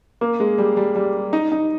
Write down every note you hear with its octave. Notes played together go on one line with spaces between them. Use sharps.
A#3
G#3
G3
G3
G3
D#4
D#4